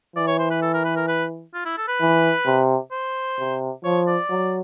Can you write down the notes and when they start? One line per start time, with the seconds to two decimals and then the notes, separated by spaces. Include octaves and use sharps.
0.16 E3 D5
0.27 C#5
0.39 C5
0.50 B4
0.62 A4
0.74 A#4
0.85 B4
0.96 A#4
1.08 B4
1.54 F4
1.65 E4
1.77 A4
1.88 B4
2.01 E3
2.46 C3
2.91 C5
3.38 C3
3.84 F3 C#5
4.07 D5
4.30 F#3